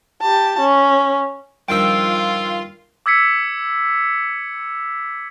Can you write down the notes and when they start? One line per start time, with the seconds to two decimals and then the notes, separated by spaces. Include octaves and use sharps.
0.21 G4 A5
0.59 C#4
1.69 G2 D#3 F3 F4 G5 E6
3.06 D6 E6 G#6 B6 C#7